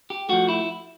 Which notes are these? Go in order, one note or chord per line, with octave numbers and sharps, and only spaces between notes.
G4
F3 A3 F#4
E4